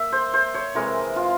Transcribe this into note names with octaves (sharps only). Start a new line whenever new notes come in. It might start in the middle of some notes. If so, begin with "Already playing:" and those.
Already playing: A#3 E5
C5
C5
C#5
C3 E3 G#3 C4 A#4
F4